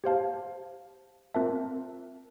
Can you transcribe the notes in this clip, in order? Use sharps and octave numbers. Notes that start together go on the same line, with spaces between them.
G4 C5 F5 A5
C4 F4 A#4 E5 A5